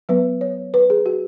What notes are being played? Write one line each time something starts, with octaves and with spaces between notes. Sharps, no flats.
F#3 B3 B4
C#5
B4
G#4
F#4